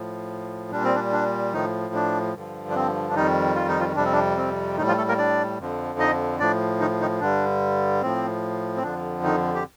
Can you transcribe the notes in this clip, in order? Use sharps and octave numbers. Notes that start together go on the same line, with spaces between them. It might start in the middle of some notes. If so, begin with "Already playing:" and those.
Already playing: A2 F3
A#2 G3 D4
C4
D4
D4
A2 D#3 F3 D#4
D4
G2 D3 F3
D4
C4
D4
F2 D#3 G3 D#4
F4
D#4
F3 F4
F2 C3 G3 D4
C4
D4
C4
A2 D#3 G3 D#4
F3 F4
A3 A4
A#3 A#4
D4 D5
F2 D3 F3
D#4 D#5
A2 F3 D4 D5
D#3 D#4
D#3 D#4
G2 D3 G3 D4
A2 F3 C4
C4
F2 D3 F3 D4
D#3 D#4
G4